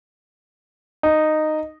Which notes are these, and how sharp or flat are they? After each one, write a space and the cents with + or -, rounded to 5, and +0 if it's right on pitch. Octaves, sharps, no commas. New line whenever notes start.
D#4 -10